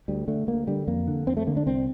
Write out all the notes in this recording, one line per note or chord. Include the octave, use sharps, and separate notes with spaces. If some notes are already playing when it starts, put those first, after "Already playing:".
D2 G3
D3 A3
D2 A#3
D3 G3
F2 A#3
D3
F2 C4
A3
D3 A#3
D4
C2 C4